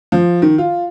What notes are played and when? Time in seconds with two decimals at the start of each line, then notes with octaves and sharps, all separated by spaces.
0.12 F3
0.42 D#3
0.58 F4